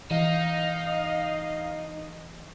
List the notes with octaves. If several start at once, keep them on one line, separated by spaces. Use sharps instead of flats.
E3 D#4 D#5 F5